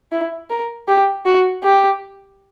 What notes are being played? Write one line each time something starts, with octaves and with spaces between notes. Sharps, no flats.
E4
A#4
G4
F#4
G4